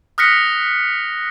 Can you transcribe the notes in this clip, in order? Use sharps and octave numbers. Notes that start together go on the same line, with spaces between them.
D#6 F6 F#6 A#6 B6 C#7